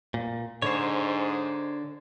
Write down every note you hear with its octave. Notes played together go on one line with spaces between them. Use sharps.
A#2
G#2 D3 C5 C#5